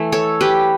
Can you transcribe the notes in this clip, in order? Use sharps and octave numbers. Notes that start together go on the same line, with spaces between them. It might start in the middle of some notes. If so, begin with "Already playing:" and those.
Already playing: E3 A3
A4 C#5
G4 B4